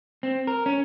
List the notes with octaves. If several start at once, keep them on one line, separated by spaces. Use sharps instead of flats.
C4
A#4
C#4